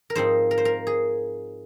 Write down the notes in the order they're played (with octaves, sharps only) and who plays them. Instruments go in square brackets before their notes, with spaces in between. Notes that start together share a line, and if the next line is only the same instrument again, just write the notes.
[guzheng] A#4
G#2 F3 C4 D#4 C5
A#4
C5
A#4
G#4